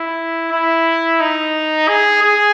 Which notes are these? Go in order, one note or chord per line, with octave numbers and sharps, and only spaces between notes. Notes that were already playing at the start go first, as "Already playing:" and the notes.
Already playing: E4
E4
D#4
G#4
G#4